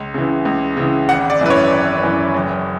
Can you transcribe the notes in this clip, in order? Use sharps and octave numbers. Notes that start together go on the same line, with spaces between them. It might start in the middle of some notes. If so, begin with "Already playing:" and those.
Already playing: C#2
C#3 E3
C#2
C#3 E3
G#1 F#5
D5
F#2 E3 B4
C#5
G#1
F#2 E3
F#1